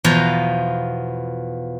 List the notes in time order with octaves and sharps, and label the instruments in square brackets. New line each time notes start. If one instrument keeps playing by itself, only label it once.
[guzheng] E2 B2 F3 B3 F4 A#5